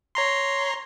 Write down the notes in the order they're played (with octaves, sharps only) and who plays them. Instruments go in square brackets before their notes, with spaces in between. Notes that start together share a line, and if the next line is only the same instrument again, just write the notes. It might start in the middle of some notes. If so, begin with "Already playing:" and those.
[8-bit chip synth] C#5 A#5 C6